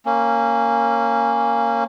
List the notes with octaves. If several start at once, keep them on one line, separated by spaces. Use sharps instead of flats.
A#3 C#4